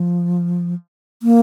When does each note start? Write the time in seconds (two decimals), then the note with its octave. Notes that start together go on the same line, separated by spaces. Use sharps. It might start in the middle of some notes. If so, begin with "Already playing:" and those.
Already playing: F3
1.22 A#3